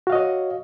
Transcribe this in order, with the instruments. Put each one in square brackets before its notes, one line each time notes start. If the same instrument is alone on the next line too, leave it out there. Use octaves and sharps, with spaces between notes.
[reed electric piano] F#4
F5
D#5
C#5